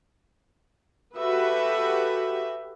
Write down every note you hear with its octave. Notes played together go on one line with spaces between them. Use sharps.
F#4 G4 A4 B4 E5